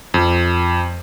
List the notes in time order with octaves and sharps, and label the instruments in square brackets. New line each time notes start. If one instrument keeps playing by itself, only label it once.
[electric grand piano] F2